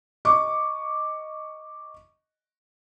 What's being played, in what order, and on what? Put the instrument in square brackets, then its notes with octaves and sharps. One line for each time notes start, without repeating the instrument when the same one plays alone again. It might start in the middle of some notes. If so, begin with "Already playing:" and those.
[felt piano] D#5 C#6 D6